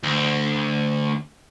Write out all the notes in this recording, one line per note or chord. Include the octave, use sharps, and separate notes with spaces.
D2